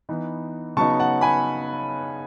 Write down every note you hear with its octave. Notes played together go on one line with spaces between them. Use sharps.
E3 B3 D#4
C#3 F#3 B3 D#4 A5 C#6
F#5 A5
G#5 B5